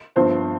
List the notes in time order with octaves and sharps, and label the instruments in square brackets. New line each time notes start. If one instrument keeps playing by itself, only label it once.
[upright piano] G1 G2 F3 C4 C5